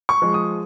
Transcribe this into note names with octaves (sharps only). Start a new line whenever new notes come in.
C#6
F3 G#3
D#6